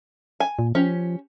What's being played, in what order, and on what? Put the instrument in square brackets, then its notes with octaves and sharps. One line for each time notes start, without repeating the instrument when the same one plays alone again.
[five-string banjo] G#5
[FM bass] A#2
[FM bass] F3 [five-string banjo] C#4 G4